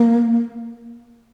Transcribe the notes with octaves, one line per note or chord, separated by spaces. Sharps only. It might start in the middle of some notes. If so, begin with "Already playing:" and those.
Already playing: A#3